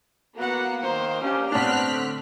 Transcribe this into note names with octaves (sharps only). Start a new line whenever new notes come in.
A#3 B3 F#4 F#5
D#3 C5
C#4 D4 G4
A2 B3 C4 D4 F6 F#6 B6
D3